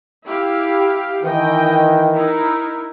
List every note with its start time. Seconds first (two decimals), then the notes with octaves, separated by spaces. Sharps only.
0.24 E4 G4 F5
1.23 D#3 E3 D#5 G5
2.13 D#4 E4 A#4